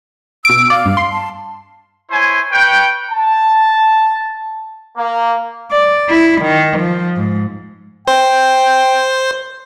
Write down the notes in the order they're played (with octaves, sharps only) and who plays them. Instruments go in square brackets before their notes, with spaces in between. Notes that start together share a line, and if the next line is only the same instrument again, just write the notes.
[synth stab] B2 D7 [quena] E6
[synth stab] D5 [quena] F5
[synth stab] G2
C6
[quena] A5
[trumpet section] E4 C5 C#5 G#5
B4 C#5 G5
A5
A#3
[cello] D5
E4
D#3
F3
G#2
[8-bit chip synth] C5 [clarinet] G5